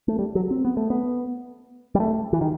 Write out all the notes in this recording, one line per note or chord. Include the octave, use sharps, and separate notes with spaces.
A3
G3
F#3
C4
B3
A3
B3
G3
A3
E3
D#3